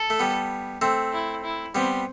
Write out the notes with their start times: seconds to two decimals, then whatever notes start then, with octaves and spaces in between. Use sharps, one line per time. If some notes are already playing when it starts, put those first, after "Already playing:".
Already playing: A4
0.10 A3
0.19 G3 B3
0.82 A3 C4
1.13 E4
1.44 E4
1.75 G3 B3 C4